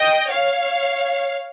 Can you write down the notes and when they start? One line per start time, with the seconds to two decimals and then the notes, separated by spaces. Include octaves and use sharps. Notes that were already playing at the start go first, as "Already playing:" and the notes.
Already playing: D#5 G5
0.31 C#5 F5